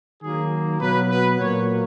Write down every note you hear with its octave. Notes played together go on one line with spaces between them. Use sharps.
D#3 F#3 A#3 G#4
B2 F#3 B3 B4
B4
A#2 F#3 A#3 C#5